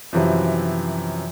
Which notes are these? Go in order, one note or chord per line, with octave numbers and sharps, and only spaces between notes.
F#2 C3 E3 F3